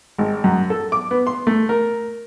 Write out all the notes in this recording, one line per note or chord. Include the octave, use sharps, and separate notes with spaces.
G#1
F#2
A4
D6
B3
C6
A3
A#4